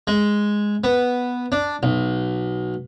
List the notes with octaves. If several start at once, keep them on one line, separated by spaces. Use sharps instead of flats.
G#3
B3
D4
B1